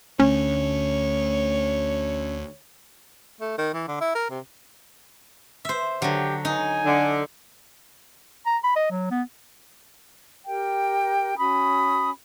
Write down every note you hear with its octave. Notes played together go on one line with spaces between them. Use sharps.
D2 A3 C#4 C#5
A3
D#3
E3
D3
E4
A#4
C3
C5 E5
D3 F#3 G4
D#4 G#5
D3
A#5
B5
D#5
F#3
B3
G4 A#4 G5
C#4 F#4 B5 D#6